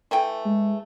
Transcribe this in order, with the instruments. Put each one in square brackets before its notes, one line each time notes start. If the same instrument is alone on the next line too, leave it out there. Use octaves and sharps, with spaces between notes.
[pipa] E3 A3 G5
[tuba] G#3